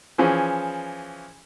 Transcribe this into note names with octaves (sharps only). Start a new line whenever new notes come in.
E3 F3 C#4 G#4